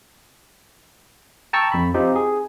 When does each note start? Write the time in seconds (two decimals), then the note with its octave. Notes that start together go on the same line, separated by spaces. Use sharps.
1.53 G5 A5 A#5 C#6 E6
1.72 F2 B5
1.94 C4 D#4 F4 G4
2.16 G#4